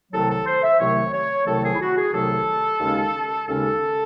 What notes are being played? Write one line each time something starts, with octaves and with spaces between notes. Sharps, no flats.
C2 C3 D#3 F#3 A3 A4
A4
C5
E5
C2 C3 D#3 F#3 A3 C#5
C#5
C2 C3 D#3 F#3 A3 A4
G#4
E4
F#4
G#4
C2 C3 D#3 F#3 A3 A4
D#2 C#3 G#3 C#4
D#2 C#3 G#3 C#4 A4